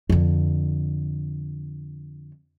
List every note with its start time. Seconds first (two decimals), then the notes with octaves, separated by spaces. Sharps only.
0.10 F2 D3